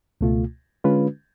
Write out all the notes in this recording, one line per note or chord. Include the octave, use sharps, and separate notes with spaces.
C#2 B2 A3 F4
D3 G#3 C#4 F4 B4